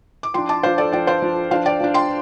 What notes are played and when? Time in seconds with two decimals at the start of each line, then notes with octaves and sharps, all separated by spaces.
0.23 D6
0.34 F3 D4 G5 C6
0.49 A5 D6
0.63 F3 D4 C5 F5
0.78 A4 D5
0.92 F3 D4 D5 G5
1.07 C5 F5
1.22 F3 D4
1.51 F3 D4 C5 F5
1.66 D5 G5
1.80 F3 D4
1.94 G5 C6